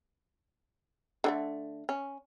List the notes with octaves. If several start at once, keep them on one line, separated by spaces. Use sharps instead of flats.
D3 G3 A3
C#4